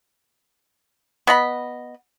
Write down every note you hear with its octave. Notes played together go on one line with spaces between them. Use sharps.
B3 D#5 B5